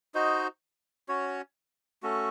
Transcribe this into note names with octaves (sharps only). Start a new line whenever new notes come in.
D#4 F#4 C5 D#5
C#4 F#4 C#5
A3 C#4 F#4 A4